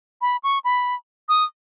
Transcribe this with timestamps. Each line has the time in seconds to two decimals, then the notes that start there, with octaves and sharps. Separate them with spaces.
0.21 B5
0.43 C#6
0.64 B5
1.29 D#6